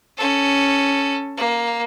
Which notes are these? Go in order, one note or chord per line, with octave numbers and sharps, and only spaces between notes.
C#4 A4
A#3